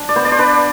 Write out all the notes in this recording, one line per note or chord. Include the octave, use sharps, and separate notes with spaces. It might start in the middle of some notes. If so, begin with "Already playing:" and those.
Already playing: D4
D5
B3 C5
D5
C5
D4 B4